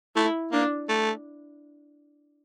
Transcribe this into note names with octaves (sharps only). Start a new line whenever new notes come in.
A3 E4
A#3 D4
A3